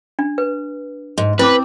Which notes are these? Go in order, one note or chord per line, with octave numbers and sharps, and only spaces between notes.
D4
B4
G#2
C4 E4 B4 D6